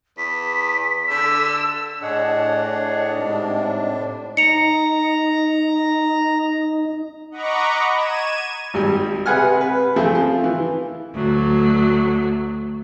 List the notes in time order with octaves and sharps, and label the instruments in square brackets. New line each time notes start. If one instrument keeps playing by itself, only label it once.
[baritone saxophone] E2 [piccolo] B6
[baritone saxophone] D3 [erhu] E6
[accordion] A2 D4 [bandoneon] G#4 C#5 F#5 [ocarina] D#5
[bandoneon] G#2 C3
[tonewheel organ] D#4 [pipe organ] A#5 [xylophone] C#7 F7
[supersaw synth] D#5 F#5 A#5 B5 C#6 D6
G#6 D#7 E7
[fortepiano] G#1 G3
C3 G#4 B4 F#5 G#5 F6
B4
F3 A3 C4 F4 G#4 C5
F4
E3
[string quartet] D2 F#3